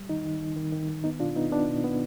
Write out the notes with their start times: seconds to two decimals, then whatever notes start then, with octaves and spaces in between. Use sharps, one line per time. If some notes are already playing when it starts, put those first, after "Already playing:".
Already playing: G3
0.09 D#3 D#4
0.25 D#3
0.41 D#3
0.56 D#3
0.72 D#3
0.89 D#3
1.04 B3 D#4
1.20 B2 D4 F4
1.36 B3 D#4
1.51 B3 D4
1.68 B2
1.84 B3